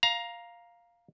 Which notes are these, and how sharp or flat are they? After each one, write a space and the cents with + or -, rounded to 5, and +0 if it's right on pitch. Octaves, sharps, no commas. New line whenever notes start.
F5 +0 A#5 +15